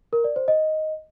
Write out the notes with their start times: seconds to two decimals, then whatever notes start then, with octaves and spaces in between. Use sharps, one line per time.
0.13 A#4
0.24 D5
0.36 C5
0.48 D#5